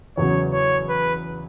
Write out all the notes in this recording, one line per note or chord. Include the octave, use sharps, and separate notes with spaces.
E2 C#3 F#3 C#5
C#5
B4